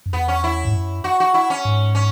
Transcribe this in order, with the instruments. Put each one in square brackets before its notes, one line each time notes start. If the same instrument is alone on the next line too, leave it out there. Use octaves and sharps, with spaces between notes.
[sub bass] F#2
[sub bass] E2 [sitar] B3
[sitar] C#4
E4
[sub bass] G#2
F#2
[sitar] F#4
F#4
E4
C#4
[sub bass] G#2
[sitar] C#4